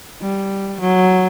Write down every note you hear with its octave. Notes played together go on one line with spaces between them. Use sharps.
G3
F#3